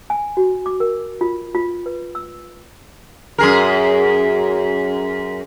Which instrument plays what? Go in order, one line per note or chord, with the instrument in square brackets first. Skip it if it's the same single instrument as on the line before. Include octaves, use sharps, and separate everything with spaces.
[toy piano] G#5
F#4
D6
A#4
F4
F4
B4
E6
[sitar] F#2 G#4 A#4